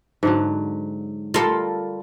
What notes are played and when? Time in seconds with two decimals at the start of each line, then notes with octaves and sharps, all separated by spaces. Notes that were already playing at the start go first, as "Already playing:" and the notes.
0.23 G#2 D3 F#3
1.34 G3 F4 A4 A#4